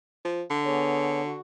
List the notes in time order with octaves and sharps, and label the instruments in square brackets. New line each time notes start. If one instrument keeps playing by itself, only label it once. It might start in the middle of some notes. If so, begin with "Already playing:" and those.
[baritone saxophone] F3
D3
[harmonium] B3 G#4 C#5
F#4